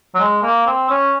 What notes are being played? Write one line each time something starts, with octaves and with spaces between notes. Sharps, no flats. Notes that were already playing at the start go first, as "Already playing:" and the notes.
F#3
G#3
A#3
C4
C#4